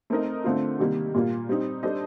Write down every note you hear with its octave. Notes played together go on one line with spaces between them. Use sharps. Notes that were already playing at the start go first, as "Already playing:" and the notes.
A3 C4 D#4 A#4 D#5
D3 A3 C4 F4
C3 D#3 G3 A#3
A#2 G3 A#3 F4
G3 C4 D#4
G3 D4 A4 C5 D#5